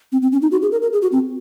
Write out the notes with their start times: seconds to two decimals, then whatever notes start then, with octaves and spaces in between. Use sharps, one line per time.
0.12 C4
0.22 C4
0.32 C#4
0.42 D#4
0.52 F#4
0.62 G#4
0.72 A#4
0.82 A#4
0.93 G#4
1.02 F#4
1.12 C4